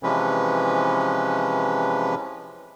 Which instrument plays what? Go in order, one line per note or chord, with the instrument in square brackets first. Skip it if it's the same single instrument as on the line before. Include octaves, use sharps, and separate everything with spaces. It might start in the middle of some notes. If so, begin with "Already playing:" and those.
[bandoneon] C3 E3 F3 G#3 C#4 B4